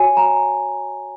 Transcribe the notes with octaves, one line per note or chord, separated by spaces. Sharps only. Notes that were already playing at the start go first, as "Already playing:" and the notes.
Already playing: F#4 C#5 G#5
A#5